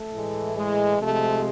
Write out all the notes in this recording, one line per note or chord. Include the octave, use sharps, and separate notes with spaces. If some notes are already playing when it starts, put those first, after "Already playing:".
Already playing: A3
A2 E3 G#3
G#3
C3 F3 G#3 A3